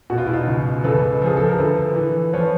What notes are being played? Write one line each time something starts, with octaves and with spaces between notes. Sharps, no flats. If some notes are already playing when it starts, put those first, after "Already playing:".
B2 F#4
F4
E4
D#4 F4
C#2
C#2 A4 B4
F3 G#4
A4
A#4
D2 A4 B4
E3
F3 B4 C#5